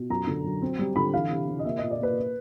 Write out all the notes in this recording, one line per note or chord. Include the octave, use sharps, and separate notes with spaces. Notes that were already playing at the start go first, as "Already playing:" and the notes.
Already playing: B2
F#2 A#5
D3
F#3
C4
G3
D3 B5
E3 F5
C3
C3
D#5
A#3 E5
A#2 D#5
D5
A#3 B4